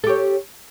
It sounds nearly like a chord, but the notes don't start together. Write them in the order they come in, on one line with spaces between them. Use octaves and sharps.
A4 G4 C#5